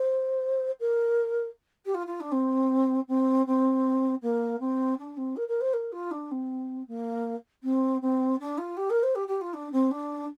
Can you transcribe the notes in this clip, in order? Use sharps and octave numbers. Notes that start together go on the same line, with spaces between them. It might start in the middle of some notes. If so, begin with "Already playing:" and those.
Already playing: C5
A#4
G4
F4
F4
D4
C4
C4
C4
A#3
C4
D4
C4
A#4
A#4
C5
A#4
F4
D4
C4
A#3
C4
C4
D4
F4
G4
A#4
C5
G4
G4
F4
D4
C4
D4